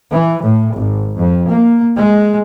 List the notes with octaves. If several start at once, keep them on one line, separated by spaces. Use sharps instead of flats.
E3
A2
G#1
F2
A#3
G#3